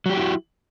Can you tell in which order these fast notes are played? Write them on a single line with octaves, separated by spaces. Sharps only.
F#3 G4 F#4 E4